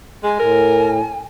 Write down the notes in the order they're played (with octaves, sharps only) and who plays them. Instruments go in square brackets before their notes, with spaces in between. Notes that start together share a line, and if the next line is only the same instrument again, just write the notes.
[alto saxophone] G#3 [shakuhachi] G#5
[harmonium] A2 [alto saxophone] A#4